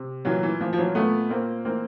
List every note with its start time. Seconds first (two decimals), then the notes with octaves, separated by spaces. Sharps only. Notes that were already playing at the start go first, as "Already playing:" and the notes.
Already playing: C3
0.25 A#2 E3 F#3
0.43 E3
0.60 A#2 F3
0.73 F3
0.78 E3 F#3
0.95 A#2 A3 B3
1.30 A#2 A#3 C4
1.65 E3 A#3 C4